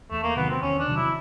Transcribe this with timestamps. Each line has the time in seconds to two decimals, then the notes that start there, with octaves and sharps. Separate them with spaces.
0.11 E2 A3
0.23 A#3
0.36 C3 D#3 F#3 B3
0.49 C4
0.62 E2 C#4
0.79 D4
0.88 C3 D#3 F#3
0.96 E4